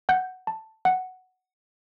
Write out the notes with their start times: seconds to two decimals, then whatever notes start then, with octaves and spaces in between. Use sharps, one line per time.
0.09 F#5 G6
0.47 A5
0.85 F#5